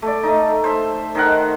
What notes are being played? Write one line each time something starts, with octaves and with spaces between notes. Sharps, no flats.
A3 D5
A3 D#4
C5 E5
D#3 D#4 A#4 F#5